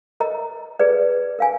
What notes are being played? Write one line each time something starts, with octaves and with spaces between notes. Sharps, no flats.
A#4 D#5 A#5
G#4 B4 D5
A#4 F5 G#5